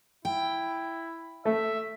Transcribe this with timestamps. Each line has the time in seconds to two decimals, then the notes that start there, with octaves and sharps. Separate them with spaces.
0.25 E4 G5
1.45 A3 E5